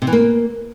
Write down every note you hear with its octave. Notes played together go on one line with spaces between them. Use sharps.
C3
E3
A#3